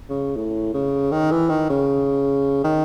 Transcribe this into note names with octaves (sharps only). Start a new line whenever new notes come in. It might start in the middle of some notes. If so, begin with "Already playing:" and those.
C#3
A2
C#3
D#3
E3
D#3
C#3
D#3